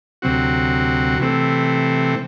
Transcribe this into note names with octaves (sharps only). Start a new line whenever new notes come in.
D2 C3 F#3 C4 F#4
C3 E3 A3 C4